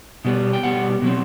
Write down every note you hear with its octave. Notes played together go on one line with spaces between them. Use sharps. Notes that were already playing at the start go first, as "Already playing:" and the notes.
B2 G3 B3
G5
B2 G3 B3 F#5
B2 F#3 C4